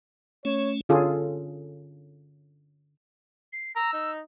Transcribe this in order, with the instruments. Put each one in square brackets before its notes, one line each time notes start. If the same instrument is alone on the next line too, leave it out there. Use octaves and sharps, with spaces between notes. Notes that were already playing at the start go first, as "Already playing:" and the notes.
[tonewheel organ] A3 C#4 [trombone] C#5
[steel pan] D3 C#4 F4 G#4 A4
[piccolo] C7
[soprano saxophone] A#5 [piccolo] E6
[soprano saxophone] D#4